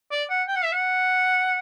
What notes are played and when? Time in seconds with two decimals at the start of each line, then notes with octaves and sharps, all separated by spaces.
0.11 D5
0.30 F#5
0.48 G5
0.56 F#5
0.64 E5
0.72 F#5